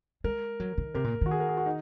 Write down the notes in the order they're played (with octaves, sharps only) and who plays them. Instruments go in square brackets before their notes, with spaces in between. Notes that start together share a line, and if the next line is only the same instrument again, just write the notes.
[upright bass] G#3 [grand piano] A#4
[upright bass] F#3
D#3
[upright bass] C3 [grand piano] A#4
[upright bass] A#2
[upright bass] D#3 [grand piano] F#4
[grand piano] G#4
A#4
G#4
F#4
D#4